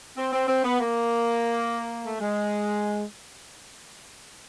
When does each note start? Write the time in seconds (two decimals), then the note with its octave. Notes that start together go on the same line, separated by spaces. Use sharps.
0.17 C4
0.32 C4
0.48 C4
0.64 B3
0.80 A#3
2.05 A3
2.20 G#3